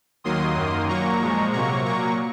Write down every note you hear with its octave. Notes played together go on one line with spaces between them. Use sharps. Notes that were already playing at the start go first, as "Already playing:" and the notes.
D#2 D#3 F#3 A#3 C6 D#6
F#2 D#3 A#3
A#2 F#3 A#3 A#5 C#6
A#2 F3 G#3
C3 F#3 A#3 A#5 C#6
A#2 F#3 A#3 A#5 C#6